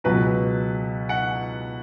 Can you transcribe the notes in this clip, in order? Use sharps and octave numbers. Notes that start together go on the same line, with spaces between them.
C#2 B2 F#3 B4
F#5